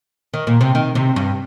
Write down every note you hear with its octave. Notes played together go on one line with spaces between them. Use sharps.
D#3
A#2
C3
D#3
C3
G2